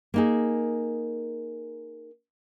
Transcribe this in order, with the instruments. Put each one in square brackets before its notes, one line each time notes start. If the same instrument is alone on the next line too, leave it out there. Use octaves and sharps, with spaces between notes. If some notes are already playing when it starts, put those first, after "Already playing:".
[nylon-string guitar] A#3 D#4 G#4